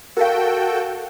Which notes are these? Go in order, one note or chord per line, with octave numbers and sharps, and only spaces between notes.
F#4 A4 A#4 F5 G5